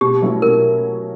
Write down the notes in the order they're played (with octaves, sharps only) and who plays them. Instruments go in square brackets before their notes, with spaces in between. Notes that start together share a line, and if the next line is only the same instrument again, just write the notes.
[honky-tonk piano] B2 [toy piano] G4
[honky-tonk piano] F#3 A3 C#4 E4
[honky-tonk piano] B2 [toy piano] A#4